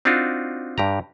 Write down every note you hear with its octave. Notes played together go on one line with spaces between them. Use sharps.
C4 D4 D#4 F4 F#4
G2 G4 A#5